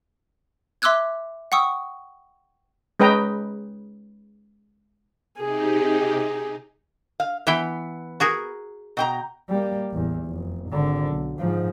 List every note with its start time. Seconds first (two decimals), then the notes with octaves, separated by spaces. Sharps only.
0.82 E5 C6 D6 E6 F#6 G#6
1.52 F#5 G5 C#6 D#6 E6
3.00 G#3 C#4 B4 D#5 G5 A#5
5.38 C3 D#4 G4 G#4
7.20 F5
7.47 E3 B3 E4 G5
8.20 F#4 G#4 A#4
8.97 B2 G5 A#5
9.49 G3 A#3
9.91 A1 E2
10.26 F1
10.70 G#1 D3
11.08 B1
11.39 G#2 F3